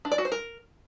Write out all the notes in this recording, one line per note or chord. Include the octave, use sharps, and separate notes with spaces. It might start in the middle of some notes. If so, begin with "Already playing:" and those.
D4
D5
F#4
C5
A#4